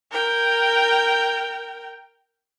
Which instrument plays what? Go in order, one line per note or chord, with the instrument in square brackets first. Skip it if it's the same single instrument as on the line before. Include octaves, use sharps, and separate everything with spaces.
[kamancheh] A#4 G5